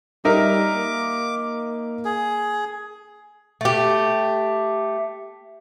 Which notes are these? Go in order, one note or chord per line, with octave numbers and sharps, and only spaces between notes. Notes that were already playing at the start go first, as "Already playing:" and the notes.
G3 D#4 A#4 E5 D6
A#3
G#4
A3 G4